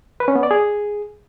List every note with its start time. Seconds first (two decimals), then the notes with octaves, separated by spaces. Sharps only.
0.20 B4
0.28 C#4
0.35 B3
0.43 D5
0.51 G#4